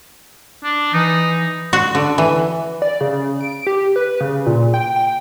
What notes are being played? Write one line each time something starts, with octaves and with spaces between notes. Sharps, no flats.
D4
E3 D#4
F#4
D3
E3
D5
C#3
D7
G4
B4
C#3
A#2
G5
G5